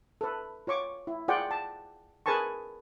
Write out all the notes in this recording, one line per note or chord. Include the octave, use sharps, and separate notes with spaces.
A4 B4
F4 C#5 C#6 D6
E4
F4 G#4 D5 F#5 G5
A5
G#4 A#4 B4 G#5 A5 C#6